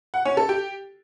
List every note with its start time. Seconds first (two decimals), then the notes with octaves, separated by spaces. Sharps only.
0.14 F#5
0.25 C#4
0.37 A4
0.49 G4